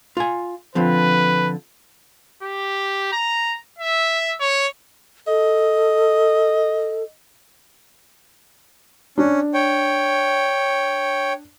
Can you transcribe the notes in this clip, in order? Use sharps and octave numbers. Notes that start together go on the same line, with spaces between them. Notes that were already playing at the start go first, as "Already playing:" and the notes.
F4 G#5
D3 F3 C4 B4
G4
A#5
E5
C#5
A4 D#5
C#4 D4
C#5 G5